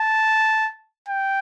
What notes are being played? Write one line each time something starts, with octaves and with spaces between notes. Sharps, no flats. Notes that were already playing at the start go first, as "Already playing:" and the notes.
Already playing: A5
G5